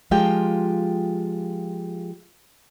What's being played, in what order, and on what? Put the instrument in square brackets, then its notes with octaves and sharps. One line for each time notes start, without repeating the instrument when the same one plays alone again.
[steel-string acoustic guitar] F3 G#3 F4 G4 G5